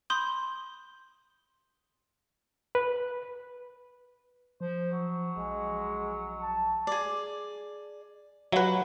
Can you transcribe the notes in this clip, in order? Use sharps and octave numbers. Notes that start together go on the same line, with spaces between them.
B5 C6 D#6 G6
B4
F3 C5
F#3
A#1 G#3
A5
G#4 D5
F#3 E4 F#4 B4